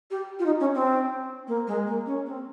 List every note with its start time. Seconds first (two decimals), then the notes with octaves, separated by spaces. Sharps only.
0.10 G4
0.39 F4
0.45 D#4
0.59 C#4
0.74 C4
1.47 A#3
1.67 G#3
1.86 A#3
2.06 C#4
2.26 C4